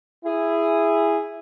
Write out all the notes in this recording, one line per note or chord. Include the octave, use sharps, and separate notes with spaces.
E4 G#4